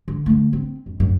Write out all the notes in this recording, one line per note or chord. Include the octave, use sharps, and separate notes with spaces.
D3
D3 A3
C4
F2
F#2